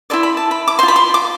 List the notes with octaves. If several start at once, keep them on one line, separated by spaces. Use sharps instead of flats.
E4 A4 D5 C6
B5
A5
B5
D6
C5 C6
F4
B5
C6
D6